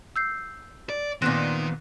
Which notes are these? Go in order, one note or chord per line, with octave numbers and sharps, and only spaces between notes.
E6 G6 C7
D5
A#2 D#3 B3 C4 F#6 A#6 E7